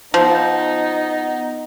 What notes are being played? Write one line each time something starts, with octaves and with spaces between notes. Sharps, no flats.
F3 B3 D#4